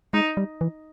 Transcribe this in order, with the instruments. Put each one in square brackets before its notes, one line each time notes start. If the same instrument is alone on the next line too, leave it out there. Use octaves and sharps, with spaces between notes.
[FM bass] G#3 [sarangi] D#4
[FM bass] G3
E3